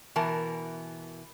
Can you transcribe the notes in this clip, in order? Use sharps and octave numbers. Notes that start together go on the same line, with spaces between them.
B2 E3 A#4 A5